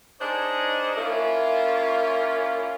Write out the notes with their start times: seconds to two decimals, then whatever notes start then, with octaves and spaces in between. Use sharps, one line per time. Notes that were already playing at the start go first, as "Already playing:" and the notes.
0.21 D4 D#4 G#4 C5 C#5 D#5
0.97 A#3 C#4 E4 F4